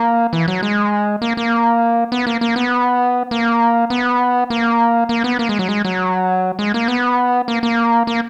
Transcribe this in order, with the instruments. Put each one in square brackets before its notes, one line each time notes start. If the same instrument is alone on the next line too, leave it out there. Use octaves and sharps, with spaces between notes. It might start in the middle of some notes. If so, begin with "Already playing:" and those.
Already playing: [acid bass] A#3
E3
F#3
G#3
A#3
A#3
B3
A#3
A#3
B3
A#3
B3
A#3
A#3
B3
A#3
G#3
F#3
G#3
F#3
G#3
A#3
B3
A#3
A#3
A#3